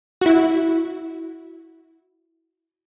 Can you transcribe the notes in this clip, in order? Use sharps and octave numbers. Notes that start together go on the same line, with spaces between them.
E4 F#4